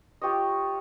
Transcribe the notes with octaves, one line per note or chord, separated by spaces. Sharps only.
F4 G4 C#5 D#5